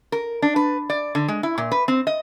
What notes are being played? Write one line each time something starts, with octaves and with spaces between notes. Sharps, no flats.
A#4
D4
B4
D5
D3
G#3
E4
A#2
B4
C4
D#5